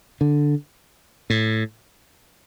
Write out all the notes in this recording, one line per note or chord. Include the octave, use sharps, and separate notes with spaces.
D3
A2